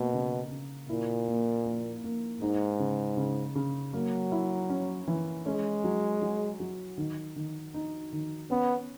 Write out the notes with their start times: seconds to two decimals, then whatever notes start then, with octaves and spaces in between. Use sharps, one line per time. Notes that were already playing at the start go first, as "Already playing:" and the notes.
Already playing: B2 A#3
0.13 C#3
0.51 C#3
0.89 A#2 E4
1.27 A#3
1.65 A#3
2.04 A#3
2.41 G#2 D#4
2.79 C#3
3.17 C#3
3.55 C#3
3.93 F#3 A#3
4.32 E4
4.70 C#4
5.07 E3
5.46 G#3 C#4
5.84 F#3
6.22 F#3
6.60 F#3
6.98 D#3
7.36 D#3
7.74 D#4
8.13 D#3
8.50 B3 C#4